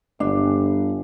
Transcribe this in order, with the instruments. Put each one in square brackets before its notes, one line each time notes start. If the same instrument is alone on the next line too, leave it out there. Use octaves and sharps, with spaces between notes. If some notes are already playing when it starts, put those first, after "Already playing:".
[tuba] G1 [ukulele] D4